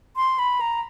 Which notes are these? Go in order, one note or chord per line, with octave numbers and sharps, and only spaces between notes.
C6
B5
A#5